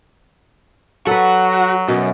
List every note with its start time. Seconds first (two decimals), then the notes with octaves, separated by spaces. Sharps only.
1.07 F#3 F#4 A4 B4
1.88 F#2 B2